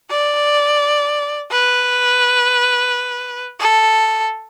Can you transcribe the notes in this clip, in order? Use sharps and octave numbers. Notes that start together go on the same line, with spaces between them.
D5
B4
A4